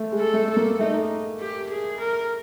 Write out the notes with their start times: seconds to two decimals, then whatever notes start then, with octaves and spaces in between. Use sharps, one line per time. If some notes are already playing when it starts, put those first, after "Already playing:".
Already playing: A3
0.12 G#3
0.19 A4
0.33 A3
0.50 A4
0.56 A#3
0.79 A3 D#4
1.40 G4
1.70 G#4
2.00 A#4